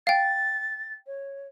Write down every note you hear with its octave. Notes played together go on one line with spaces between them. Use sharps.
F5 G5 A6
C#5